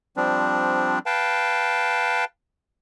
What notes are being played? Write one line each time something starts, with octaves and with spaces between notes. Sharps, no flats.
F3 G3 C4 D4
B4 F5 G5 A5